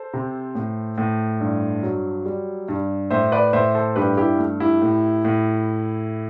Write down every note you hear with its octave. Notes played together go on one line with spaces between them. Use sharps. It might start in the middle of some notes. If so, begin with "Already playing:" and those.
Already playing: A4 C5
C3
A2
A2
G2
F#3
G3
G2
A2 C5 E5
B4 D5
A2 C5 E5
A4 C5
G2 G4 B4
E4 G4
A3
E4 G4
A2
A2